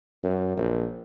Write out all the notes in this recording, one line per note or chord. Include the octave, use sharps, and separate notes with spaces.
F#2
A#1